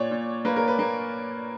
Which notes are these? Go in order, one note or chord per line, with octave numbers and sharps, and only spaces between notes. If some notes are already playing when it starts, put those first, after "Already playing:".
Already playing: A#2 C#5 D5
A#2
A#3 B4
A#4
B4
A#3